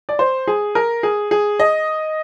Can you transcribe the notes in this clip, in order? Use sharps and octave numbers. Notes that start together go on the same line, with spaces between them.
D5
C5
G#4
A#4
G#4
G#4
D#5